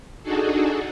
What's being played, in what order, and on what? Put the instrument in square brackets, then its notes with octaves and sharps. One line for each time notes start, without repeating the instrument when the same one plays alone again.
[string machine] D4 D#4 F#4 G#4 A4